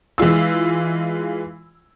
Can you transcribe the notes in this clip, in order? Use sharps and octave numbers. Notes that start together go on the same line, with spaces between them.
E3 G#3 F4 E6